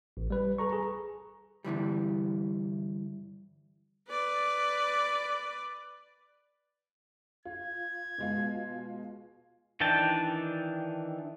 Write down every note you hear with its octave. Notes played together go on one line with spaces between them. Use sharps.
A1
G3 B4
A4 B4 A#5 C#6
G#4 A#5
G2 D3 E3 G3
B4 D5
F4 G#6
B2 G#3 F4
D#3 E3 D4 G5 A5